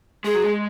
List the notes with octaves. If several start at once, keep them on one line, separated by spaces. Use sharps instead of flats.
G#3 G#4
F#3
G#3